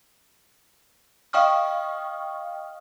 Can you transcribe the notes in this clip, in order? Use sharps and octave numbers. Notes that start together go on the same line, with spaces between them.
D#5 F5 G5 C#6 D#6 F6